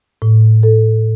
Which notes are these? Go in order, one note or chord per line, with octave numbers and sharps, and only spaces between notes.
A2
A4